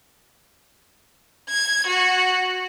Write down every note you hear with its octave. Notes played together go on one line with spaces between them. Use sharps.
G#6
F#4